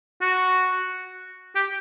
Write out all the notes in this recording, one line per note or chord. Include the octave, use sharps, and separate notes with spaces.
F#4
G4